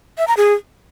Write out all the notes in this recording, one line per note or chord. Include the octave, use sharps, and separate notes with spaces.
E5
A#5
G#4